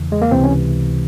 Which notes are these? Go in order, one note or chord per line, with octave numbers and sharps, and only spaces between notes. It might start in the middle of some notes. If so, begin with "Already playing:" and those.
Already playing: E2 C#3 E3
G#3
A#3
C#2 C3 E3 C4
C#4